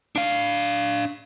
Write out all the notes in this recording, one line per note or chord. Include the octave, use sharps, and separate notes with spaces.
D4 F5